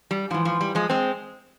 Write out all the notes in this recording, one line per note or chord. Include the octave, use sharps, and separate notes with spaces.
G3
G#2 E3 F3
F3
G3
F3 G#3
G#3 C4